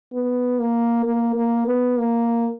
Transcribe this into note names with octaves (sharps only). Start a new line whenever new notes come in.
B3
A#3
A#3
A#3
B3
A#3